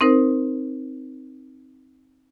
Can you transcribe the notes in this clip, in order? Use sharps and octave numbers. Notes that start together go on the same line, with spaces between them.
C4 D#4 A#4 C5